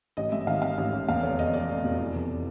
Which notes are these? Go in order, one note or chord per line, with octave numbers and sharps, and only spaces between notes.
A1 D#5
G#2 E5
D#3 F5
G#2 F5
A1
A1
E2 F5
F1 C#5
F1 D#5
F1 D5
F1
B2
E3
F1